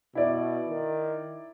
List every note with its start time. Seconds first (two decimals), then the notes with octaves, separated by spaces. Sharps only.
0.15 B2 E4 D5
0.69 D#3